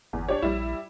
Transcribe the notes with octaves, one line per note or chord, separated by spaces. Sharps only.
G1 E2
D4 G4 C#5
A#1 G3 E4